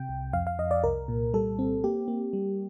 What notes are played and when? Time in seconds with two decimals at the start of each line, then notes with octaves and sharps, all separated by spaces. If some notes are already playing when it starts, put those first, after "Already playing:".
Already playing: C3 G5
0.09 C2
0.33 F2 F5
0.47 F5
0.59 F2 D#5
0.71 D5
0.84 C2 A#4
1.08 A#2
1.34 G3 A4
1.59 C4
1.84 A#3 G4
2.08 A#3
2.33 G3